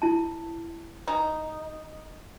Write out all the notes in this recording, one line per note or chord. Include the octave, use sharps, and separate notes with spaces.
E4 A5
D#4 A#5